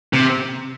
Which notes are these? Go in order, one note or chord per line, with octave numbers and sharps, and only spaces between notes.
C3